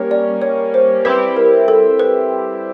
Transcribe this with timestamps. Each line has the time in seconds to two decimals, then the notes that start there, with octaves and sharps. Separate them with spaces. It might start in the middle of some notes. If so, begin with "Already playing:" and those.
Already playing: G3 A#3 C#4
0.11 D5
0.42 C#5
0.74 C5
1.05 G3 C4 E4 G4 B4
1.37 A#4
1.68 A4
1.99 B4